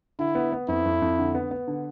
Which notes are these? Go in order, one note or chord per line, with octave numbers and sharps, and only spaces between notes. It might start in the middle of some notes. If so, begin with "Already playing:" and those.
D3 E4
B3
B3
F2 E4
F2
F2
D3
B3
B3
D3